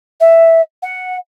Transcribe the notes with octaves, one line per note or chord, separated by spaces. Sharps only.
E5
F#5